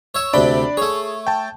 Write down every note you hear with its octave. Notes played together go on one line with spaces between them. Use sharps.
C#5 E5
D2 C3 D4 D5 G5 B5
A3 G#4 C#5
G5 A5